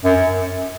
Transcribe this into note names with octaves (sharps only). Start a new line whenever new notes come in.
F#2